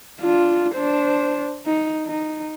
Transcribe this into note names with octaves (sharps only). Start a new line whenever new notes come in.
D4 F4
D4 C5
D#4
D#4